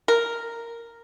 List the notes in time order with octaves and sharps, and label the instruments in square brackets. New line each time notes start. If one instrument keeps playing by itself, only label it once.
[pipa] A#4